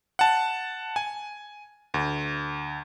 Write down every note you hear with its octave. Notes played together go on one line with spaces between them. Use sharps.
F#5 A5
G#5
D2